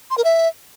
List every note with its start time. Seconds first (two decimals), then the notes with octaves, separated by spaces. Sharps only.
0.10 C6
0.17 A#4
0.24 E5